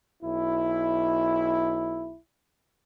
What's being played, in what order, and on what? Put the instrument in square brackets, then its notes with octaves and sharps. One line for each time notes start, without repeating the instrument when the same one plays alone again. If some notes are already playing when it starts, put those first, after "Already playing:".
[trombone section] B1 E4